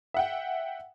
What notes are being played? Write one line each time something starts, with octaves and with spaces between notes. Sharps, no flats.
E5 F#5 G5